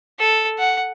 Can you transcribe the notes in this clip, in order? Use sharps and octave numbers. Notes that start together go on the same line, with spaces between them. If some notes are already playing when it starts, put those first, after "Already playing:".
A4
F#5